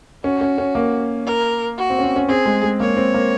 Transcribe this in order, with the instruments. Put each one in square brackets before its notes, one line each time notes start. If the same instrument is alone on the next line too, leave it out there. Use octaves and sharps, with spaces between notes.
[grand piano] C#4 [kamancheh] F#4
[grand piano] C#4
C#4
A#3
[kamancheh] A#4
F#4
[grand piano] C4
C#4
C4
C#4
[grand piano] C4 [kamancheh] G#4
[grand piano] G#3
G#3
[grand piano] A#3 [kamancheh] C#5
[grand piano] C4
A#3